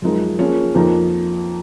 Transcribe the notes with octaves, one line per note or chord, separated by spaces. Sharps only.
F#2 F3 G#3 D#4 A#4
F3 A#3 C#4 G#4 C#5
F2 F3 A#3 D#4